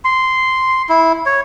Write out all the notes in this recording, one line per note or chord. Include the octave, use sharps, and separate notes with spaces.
C6
E4
C#5